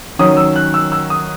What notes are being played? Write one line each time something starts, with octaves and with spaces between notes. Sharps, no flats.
D#3 F#3 C#4 D#6
E6
F#6
E6
E6
D#6